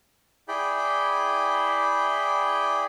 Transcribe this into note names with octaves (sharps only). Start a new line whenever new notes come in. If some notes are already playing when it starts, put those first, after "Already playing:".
E4 G#4 D5 G5 B5